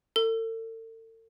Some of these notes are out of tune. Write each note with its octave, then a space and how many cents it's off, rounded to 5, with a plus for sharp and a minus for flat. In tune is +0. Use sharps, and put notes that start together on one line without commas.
A4 +40